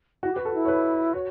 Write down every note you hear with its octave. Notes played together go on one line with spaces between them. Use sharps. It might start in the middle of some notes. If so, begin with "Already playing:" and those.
E4 F#4
G4
F#4 B4
A4
E4
C#5
B4
F#4 C#5